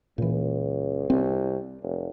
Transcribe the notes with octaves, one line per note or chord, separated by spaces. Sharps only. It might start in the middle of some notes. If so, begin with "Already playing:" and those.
C#2 A#2 E3
C2 C4
F1